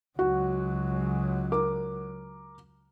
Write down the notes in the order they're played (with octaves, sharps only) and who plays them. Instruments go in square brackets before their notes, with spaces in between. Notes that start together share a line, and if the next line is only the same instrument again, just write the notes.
[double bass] C#2 F#3 [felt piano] F#4
[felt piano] A#4 D6